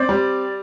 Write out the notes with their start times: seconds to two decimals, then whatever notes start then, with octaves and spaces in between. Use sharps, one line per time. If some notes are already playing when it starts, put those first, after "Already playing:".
Already playing: C4 D5
0.09 G3